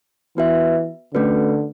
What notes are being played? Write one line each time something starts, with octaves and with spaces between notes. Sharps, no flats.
E3 B3 F#4 B4 E5
D3 A3 C#4 F#4 B4